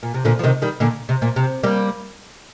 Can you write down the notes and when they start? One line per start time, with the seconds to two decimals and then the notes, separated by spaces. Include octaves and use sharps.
0.03 A#2
0.14 C3
0.25 A#2 D3
0.39 F3
0.44 C3 D#3
0.62 D#3 G3
0.80 A#2 D3
1.09 C3
1.22 A#2
1.36 C3
1.63 G3 A#3